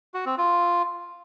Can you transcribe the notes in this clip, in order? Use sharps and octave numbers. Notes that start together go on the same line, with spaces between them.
F#4
C4
F4